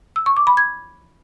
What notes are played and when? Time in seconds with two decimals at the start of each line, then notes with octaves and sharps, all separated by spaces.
0.16 E6
0.26 C#6
0.37 D6
0.47 B5
0.57 G#6